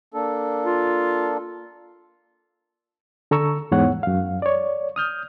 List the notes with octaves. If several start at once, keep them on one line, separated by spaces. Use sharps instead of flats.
A#3 D4 A4
F4
D3 A4 A#5 C#6 E6
E2 G#2 C#5 F#5
F#2 F5
C#5 D5
D#6 F6 G6